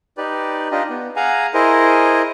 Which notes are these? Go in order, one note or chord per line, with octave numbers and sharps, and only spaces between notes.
D#4 G4 B4 D5
D4 D#4 F4 G4 D#5
B3
G#4 F5 F#5 G#5 A#5
E4 G#4 A#4 C5 D#5